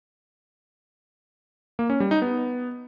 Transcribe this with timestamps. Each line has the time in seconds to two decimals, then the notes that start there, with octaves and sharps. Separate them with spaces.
1.79 A#3
1.90 C#4
2.00 G3
2.11 D#4
2.22 B3